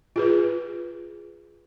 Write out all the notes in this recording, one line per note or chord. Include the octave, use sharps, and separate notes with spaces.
F4 G#4 B4